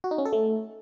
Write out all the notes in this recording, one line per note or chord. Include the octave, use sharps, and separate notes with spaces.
F#4
D#4
C#4
A4
A3